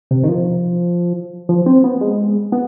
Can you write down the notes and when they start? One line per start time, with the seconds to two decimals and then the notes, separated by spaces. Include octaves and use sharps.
0.11 C3
0.24 D#3
0.28 F3
1.49 F3
1.66 C4
1.84 B3
2.01 G#3
2.52 B3